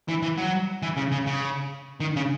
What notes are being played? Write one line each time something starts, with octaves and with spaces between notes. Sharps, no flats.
E3
E3
F#3
E3
C#3
C#3
C#3
D#3
C#3